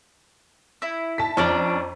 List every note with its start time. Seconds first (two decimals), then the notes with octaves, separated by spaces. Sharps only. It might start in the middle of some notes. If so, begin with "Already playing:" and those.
0.82 E4
1.18 A5 B6
1.37 F2 C#4 D4 D5 A#5